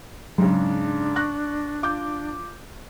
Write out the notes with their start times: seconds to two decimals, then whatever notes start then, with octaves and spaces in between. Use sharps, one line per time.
0.38 G#2 C#3 F#3 D4
1.16 C#6 F#6 A#6
1.83 F4 D6 G6